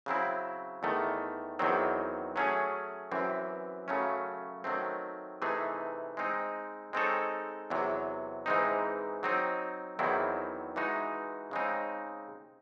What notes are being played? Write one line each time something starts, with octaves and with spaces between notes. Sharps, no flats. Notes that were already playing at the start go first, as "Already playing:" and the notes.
C#3 F#3 C4 E4
E2 D#3 A3
E2 D#3 F#3 C4
F#3 A3 C#4 G#4
F#2 E3 C4
F#2 C#3 F#3 A3 C#4
D#3 F#3 A3 C4
C3 E3 A3 D#4 G#4
G#3 C4 D#4
G#3 C4 D#4 A4 C#5
E2 C3 F#3
G#2 E3 G#3 C4 D#4
F#3 C4 D#4
E2 D#3 F#3 C4 E4
E3 G#3 D#4 F#4
C#3 G#3 C4 D#4